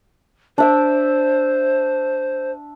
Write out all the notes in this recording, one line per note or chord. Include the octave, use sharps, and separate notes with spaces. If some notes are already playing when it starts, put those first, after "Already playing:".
D4 C5 E5 D6